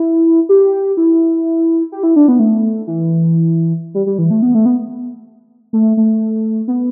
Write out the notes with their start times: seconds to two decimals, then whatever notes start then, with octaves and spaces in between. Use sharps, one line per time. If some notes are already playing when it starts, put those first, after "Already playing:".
Already playing: E4
0.49 G4
0.97 E4
1.92 G4
2.03 E4
2.16 D4
2.28 B3
2.39 A3
2.87 E3
3.94 G3
4.07 G3
4.18 E3
4.30 A3
4.42 B3
4.55 A3
4.66 B3
5.73 A3
5.97 A3
6.68 B3